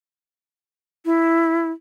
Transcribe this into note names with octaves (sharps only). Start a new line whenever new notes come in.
E4